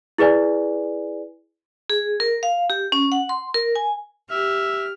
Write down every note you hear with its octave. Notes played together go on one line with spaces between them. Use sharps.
E4 G#4 B4 D5 G#5
G#4
A#4
F5
G4
C#4
F#5
C6
A#4
G#5
G4 E5 F6